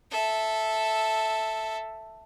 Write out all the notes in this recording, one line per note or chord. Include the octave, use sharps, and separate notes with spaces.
A4 E5